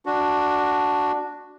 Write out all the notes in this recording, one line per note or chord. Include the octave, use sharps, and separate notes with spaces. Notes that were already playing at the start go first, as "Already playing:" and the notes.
D4 F#4